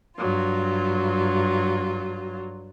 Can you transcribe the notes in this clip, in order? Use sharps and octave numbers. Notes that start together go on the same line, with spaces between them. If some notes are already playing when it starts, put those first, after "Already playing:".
G2 F#3 F4